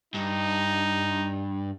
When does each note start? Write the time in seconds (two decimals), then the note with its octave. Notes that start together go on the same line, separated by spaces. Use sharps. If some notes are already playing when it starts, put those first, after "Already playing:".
0.14 G2 D#4